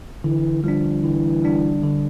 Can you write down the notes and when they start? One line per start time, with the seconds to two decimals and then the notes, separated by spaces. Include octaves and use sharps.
0.24 D3 E3
0.64 F3 G3 D4
1.03 D3 E3
1.44 G3 D4
1.83 D3